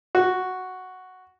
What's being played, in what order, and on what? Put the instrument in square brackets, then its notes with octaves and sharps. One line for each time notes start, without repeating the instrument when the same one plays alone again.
[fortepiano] F#4